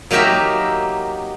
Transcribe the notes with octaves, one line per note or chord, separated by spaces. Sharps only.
F#3 A#3 D#4 G4 A#4 E5